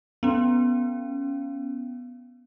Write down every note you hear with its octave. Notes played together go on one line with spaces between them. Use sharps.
B3 C#4